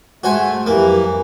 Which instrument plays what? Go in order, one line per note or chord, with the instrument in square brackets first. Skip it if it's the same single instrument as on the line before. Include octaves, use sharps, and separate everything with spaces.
[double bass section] G#2 G#3 [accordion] A3 [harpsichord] F#4 C5 G#5
[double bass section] F2 F#3 [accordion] E3 [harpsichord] A#3 [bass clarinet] G4